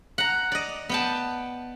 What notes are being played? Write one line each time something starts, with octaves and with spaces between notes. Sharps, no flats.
F#5 A#5
D5 D#5
B3 G5 A5